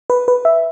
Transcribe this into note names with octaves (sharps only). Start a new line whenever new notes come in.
B4
B4
E5